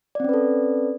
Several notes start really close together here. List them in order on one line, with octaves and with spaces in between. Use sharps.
D5 C4 C#4 B4 A4